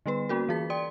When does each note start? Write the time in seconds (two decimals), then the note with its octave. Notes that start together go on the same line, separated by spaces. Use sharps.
0.06 D3 G3 B3 B4
0.29 A#3 C#4 F#4 A#4
0.49 E3 G#4 B6
0.70 D5 G5 C6